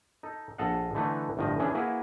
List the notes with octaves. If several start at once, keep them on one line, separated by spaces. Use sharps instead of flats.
D#4 A4
A#1 A4 D#5 F5 F#5
D3 E3 A3 D#4 B4
G1 A2 D#3 F3 D#5
E3 C#4 D4 G#4
A#3 E4 F#4 G#4 B4